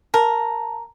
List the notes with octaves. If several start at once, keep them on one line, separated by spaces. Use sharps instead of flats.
A#4 A5